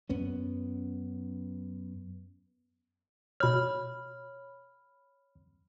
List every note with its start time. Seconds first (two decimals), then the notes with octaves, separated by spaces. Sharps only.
0.09 F#2 B3 C#4
3.40 B2 C#5 B5 F6 G6